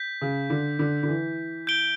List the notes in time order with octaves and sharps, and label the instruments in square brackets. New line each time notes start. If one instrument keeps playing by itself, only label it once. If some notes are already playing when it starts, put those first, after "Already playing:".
Already playing: [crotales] G6 B6
[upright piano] C#3
D3
D3
D3
E3
[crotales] G6 D7 G7